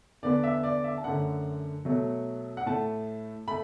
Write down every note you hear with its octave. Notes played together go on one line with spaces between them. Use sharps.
E2 D3 B3 D5
E5
D5
E5
A5
F#2 D3 A3 F#5
B2 F#3 A3
F#5
A2 A3 A5
A3 B5